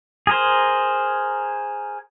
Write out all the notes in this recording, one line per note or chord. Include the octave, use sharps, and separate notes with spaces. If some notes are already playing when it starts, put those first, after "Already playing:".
G#4 A#4 C5